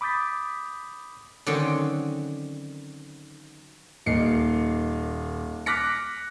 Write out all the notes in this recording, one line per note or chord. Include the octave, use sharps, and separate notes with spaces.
B5 D6 D#6 G6 A6 B6
D3 D#3 F#3 C4 C#4
D#1 A#3 D#4 C7 C#7
D6 F6 F#6 A#6 B6 C#7